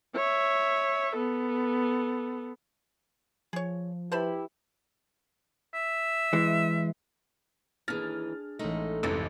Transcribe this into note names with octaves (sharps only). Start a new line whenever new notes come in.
C#5 E5
B3 A4
F3 G#4 C#5
E4 G4 B4 C5 A5 B5
E5
E3 G#3
D#2 E3 D4 G#4 F6 A6
A1 G#3 A3 D#4 A#4
A1 F2 G#2 C3 E3 A3 A6